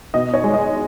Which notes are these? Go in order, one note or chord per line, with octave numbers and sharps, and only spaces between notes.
B2 D#5
C#5
G#3
D#5